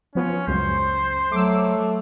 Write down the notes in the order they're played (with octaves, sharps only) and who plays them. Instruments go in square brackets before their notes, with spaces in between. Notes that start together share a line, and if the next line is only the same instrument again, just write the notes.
[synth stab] F3 B3 F4 [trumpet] C#4
[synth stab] C#2 F#2 [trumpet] C5
[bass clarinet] F#3 [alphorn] A3 [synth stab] D6 E6